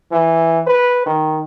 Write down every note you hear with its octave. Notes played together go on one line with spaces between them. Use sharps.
E3
B4
D#3